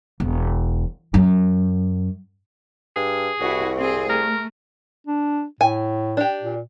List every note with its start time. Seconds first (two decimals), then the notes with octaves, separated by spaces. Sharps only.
0.20 E1
1.14 F#2
2.96 G2 G#4
3.40 C2 E4 F#4
3.78 C4 G#4
4.09 A3 A#4
5.07 D4
5.61 A2 G#5
6.17 D4 G4
6.42 A#2